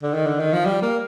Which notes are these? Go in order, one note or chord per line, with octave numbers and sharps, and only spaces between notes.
D3
D#3
D3
D#3
F3
G3
A#3